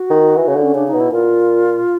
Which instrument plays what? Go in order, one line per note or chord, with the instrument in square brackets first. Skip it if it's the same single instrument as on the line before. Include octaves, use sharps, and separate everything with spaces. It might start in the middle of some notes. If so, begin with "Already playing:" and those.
Already playing: [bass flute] F#4
[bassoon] D#3
E3
C#3
D3
[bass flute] C#4
[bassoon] C#3 [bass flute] D4
[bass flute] D#4
[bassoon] B2
[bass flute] E4
[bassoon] A#2 [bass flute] F4